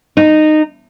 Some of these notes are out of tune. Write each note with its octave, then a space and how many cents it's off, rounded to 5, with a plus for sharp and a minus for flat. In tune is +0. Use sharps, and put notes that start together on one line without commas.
D#4 -15